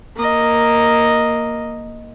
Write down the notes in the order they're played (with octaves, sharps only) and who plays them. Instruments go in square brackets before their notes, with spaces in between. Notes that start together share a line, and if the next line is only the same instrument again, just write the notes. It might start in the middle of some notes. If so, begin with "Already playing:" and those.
[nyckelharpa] A#3 D#5